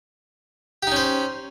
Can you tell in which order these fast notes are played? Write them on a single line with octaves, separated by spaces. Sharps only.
G4 D#4 C#4 C5